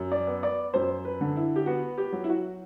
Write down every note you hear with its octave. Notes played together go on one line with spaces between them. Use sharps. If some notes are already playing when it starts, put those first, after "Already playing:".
Already playing: F#2
D5
B3
D5
F#2 C5
B4
D3
E4
G4
B3 F#4
G4
F#3
E4
F#4